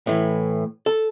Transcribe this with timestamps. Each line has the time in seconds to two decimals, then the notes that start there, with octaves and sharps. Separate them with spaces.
0.07 A2 E3
0.86 A4